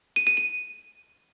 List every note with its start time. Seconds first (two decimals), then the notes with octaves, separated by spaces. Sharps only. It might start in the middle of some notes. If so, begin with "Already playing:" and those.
0.16 D#7
0.27 D#7
0.37 D#7